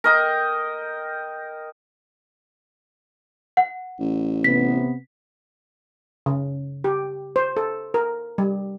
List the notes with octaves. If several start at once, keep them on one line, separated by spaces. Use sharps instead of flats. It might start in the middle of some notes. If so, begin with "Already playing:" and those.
A#4 D#5 G5
F#5
A1
C3 B3 B6
C#3
G4
C5
A4
A#4
G3